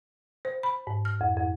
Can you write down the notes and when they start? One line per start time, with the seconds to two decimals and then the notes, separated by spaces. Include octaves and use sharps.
0.45 C5
0.63 B5
0.87 G#2
1.05 F6
1.21 F2
1.37 F2